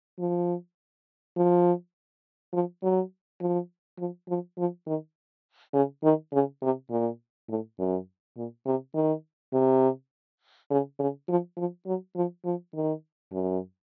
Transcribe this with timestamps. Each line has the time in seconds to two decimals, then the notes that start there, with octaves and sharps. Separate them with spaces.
0.19 F3
1.37 F3
2.54 F3
2.83 F#3
3.41 F3
3.99 F3
4.29 F3
4.58 F3
4.87 D#3
5.74 C#3
6.03 D#3
6.33 C#3
6.62 C3
6.91 A#2
7.49 A2
7.79 F#2
8.37 A#2
8.66 C3
8.95 D#3
9.53 C3
10.71 C#3
10.99 C#3
11.29 F3
11.57 F3
11.86 F#3
12.16 F3
12.45 F3
12.74 D#3
13.32 F#2